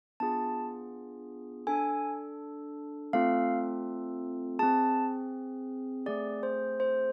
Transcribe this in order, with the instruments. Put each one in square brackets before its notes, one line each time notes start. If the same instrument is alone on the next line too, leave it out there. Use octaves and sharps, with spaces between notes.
[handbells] B3 D4 F4 G#4 A5
D4 A4 G#5
A3 C4 F4 A4 F5
C4 G#4 A5
A3 C4 G#4 D5
C5
C5